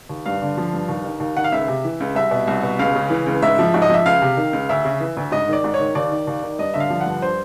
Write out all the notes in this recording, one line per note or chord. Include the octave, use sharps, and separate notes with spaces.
D#2
G2 F5
D3
F3
G2
D#2
D#3
D#2
D#3 F#5
F5
C#2 E5
C3
E3
C#2
C2 E5
B2
C2
B2
C#2 F5
C#3
E3
C#2
G#2 E5
F3
G#2
D#5
F3 E5
C#2 F5
C3
D#3
C#2
D2 E5
C#3
E3
D2
G#2 D#5
D#3 D5
G#2
C#5
D#3
D#2 D5
D#3
D#2
D#3
G2 D#5
D3 E5
F5
F3
F#5
G2
C5